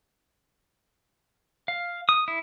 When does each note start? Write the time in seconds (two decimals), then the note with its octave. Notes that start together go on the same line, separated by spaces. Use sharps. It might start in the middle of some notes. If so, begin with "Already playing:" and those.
1.68 F5
2.09 D#6
2.28 E4